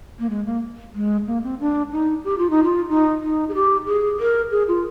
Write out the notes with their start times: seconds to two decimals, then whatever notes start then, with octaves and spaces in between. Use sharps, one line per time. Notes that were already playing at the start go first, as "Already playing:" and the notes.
0.19 A#3
0.30 G#3
0.46 A#3
0.95 G#3
1.27 A#3
1.44 C4
1.60 D4
1.92 D#4
2.24 G4
2.38 F4
2.50 D#4
2.63 F4
2.89 D#4
3.22 D#4
3.49 G#4
3.55 G4
3.86 G#4
4.20 A#4
4.52 G#4
4.68 F4